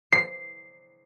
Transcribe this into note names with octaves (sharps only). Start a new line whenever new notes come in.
C7